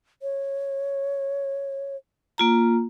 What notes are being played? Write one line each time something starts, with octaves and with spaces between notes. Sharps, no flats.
C#5
A#3 F4 A#5